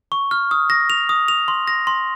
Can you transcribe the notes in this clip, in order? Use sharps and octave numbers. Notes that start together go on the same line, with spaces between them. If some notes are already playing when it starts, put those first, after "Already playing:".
C#6
F6
D#6
A#6
F7
D#6
F7
C6
A#6
C6